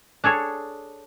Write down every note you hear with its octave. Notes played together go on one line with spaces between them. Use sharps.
D4 G#4 A4 C#5